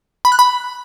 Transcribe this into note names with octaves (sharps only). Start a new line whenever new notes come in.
B5
F#6
B5